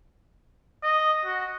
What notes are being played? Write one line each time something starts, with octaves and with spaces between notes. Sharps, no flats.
D#5
F#4